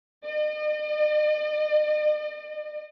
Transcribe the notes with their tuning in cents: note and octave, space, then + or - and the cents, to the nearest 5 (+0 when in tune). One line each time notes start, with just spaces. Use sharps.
D#5 -45